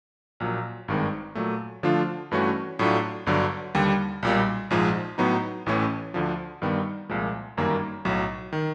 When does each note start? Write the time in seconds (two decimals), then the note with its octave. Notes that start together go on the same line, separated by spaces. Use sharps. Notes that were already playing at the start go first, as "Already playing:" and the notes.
0.40 A#1 A#2 F#3
0.88 G#1 G2 D#3 G#3 C4
1.35 A#2 F#3 A3
1.83 D3 F3 A3 D4 F4
2.31 G2 E3 A3 C#4 F#4
2.79 A2 F#3 A3 D4 F4
3.26 G1 G2 D3 F#3
3.75 D#2 D3 G3
4.23 B1 A#2 G3
4.70 A#1 G#2 F3 G#3
5.18 A2 F#3 B3 D#4
5.66 A1 A2 E3 A3 C#4
6.14 D2 D3 F3
6.62 G2 D#3 G3 B3
7.10 C2 A#2 F3 G#3
7.57 G1 F#2 D#3 G3 A#3
8.05 B1 A2 F#3
8.53 D#3